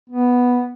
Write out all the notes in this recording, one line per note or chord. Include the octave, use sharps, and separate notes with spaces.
B3